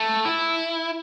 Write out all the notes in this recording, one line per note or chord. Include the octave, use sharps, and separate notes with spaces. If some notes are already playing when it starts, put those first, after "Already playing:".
Already playing: A3
E4